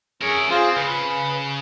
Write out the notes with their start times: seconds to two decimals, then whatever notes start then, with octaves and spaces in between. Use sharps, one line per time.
0.21 C#4 G#4 A#4 C#5 E5
0.50 C4 F4 G#4 C5
0.76 C#3 B4